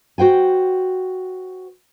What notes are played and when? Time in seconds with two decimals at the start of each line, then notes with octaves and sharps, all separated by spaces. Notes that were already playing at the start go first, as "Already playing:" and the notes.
0.18 F#4 C5 G5 G#5